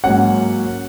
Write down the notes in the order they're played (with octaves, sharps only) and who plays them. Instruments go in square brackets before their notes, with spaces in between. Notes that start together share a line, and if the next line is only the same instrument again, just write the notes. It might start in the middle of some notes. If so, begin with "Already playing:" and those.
[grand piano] G#2 F#3 A#3 C#4 F#5